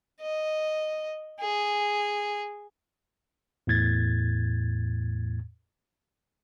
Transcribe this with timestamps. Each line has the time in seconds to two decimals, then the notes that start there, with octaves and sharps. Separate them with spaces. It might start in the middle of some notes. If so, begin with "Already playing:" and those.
0.21 D#5
1.40 G#4
3.67 E2 A2 G#6 A6